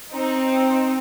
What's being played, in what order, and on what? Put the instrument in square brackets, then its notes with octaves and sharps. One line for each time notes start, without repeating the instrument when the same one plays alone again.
[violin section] C4 D#4